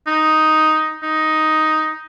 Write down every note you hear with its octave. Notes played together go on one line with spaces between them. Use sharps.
D#4
D#4